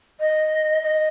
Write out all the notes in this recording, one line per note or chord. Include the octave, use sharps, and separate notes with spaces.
D#5
D#5